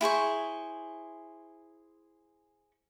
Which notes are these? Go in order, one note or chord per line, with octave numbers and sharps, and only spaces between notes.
E4 G#4 C5 C#6